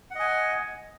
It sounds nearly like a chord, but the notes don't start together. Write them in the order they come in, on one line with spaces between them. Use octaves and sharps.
F#5 D#5 G#5